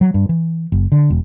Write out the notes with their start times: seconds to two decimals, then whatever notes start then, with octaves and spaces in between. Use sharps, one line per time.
0.01 F#3
0.14 G2
0.29 E3
0.72 F#1
0.92 D3
1.10 E1